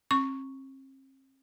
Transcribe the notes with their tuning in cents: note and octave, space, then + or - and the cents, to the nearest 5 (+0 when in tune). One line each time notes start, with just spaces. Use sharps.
C4 +40 C#6 +0